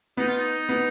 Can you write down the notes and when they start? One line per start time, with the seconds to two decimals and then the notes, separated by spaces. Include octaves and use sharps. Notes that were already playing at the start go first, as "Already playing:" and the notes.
0.17 B3 D#4
0.27 F4
0.37 D#4
0.69 B3